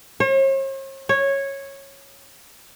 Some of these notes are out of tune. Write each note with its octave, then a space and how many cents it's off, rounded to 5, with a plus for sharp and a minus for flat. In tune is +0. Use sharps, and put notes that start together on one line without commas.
C#5 -45
C#5 -10